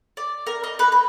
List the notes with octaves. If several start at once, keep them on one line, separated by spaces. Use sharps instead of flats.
D5
A#4
D#5
B4
B4